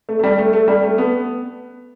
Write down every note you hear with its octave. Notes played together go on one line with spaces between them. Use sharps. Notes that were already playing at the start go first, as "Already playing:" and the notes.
A3
A3
G3
A3
A3
G3
A3
B3